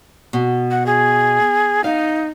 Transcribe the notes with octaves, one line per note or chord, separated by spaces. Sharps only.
B2
F#5
G#4
D#4 F5